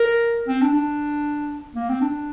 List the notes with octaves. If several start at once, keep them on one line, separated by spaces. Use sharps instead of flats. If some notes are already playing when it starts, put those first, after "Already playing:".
Already playing: A#4
C4
D4
D4
A#3
C4
D4